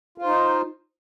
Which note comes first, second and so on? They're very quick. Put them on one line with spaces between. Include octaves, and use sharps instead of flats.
F4 C5 D#4